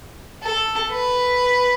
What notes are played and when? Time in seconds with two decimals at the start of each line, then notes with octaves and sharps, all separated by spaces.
0.43 A4
0.91 B4